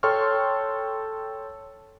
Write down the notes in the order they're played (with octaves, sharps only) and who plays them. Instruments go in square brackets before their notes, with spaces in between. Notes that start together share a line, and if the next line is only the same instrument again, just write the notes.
[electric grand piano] A4 C#5 G5 C6 C#6 F6